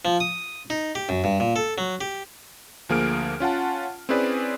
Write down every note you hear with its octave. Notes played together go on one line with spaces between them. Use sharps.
F3
D#6
D#4
G4
F#2
G2
A#2
A4
F#3
G4
D2 F3 A#3 G#4 F6 D7
C#4 F4 F#5 A5
C4 C#4 E4 G#4 B4 D5